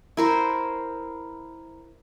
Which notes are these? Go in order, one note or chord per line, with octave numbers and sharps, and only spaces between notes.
E4 A#4 C5